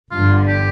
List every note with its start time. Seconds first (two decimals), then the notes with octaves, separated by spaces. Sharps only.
0.11 G1 G2 D3 F4
0.48 G4